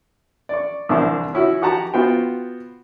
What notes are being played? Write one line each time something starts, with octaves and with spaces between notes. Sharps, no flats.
D5 C#6
C2 C3 E3 D4 A#4 C5
C#4 E4 F#4
F#4 G4 F#5 A5 A#5
B3 F4 F#4 C5 G5